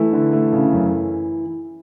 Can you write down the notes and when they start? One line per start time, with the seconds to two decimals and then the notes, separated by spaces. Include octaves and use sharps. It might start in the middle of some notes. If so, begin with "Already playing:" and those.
Already playing: E3 A3
0.13 D3
0.33 A3
0.53 C#3
0.73 F#2